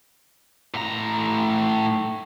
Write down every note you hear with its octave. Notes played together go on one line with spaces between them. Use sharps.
A2 A#5